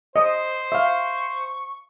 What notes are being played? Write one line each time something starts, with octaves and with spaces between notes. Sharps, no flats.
C5 D#5
E5 F5 C#6